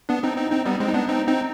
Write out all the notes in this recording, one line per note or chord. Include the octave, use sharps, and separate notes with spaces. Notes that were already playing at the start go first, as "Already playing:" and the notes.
B3 D4
C4 D#4
C4 D#4
C4 D#4
G3 B3
G#3 C4
D#4
B3 D4
C4 D#4
C4 D#4